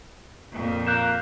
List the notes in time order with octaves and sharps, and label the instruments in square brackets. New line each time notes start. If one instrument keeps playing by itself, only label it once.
[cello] F2 A#2
[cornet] A#3 [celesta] F#6 G6 E7